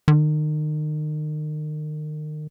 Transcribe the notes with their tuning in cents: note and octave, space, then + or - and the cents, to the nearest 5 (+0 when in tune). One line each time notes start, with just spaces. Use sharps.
D#3 -35